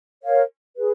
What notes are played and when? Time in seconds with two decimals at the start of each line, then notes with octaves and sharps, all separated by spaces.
0.23 A#4 C#5 F5
0.76 G#4 B4